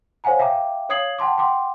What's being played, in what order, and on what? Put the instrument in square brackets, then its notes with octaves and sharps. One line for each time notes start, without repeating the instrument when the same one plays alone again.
[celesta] C5 C#5 F5 F#5 G#5 A#5
E5 F5 G5 A#5 D6
C#5 F5 D#6 G#6 C7 F#7
F#5 G5 A5 C6 D6
F#5 G5 C6 D6